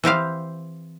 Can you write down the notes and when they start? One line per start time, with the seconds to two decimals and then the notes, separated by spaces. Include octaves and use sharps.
0.04 E3 C4 G4 F5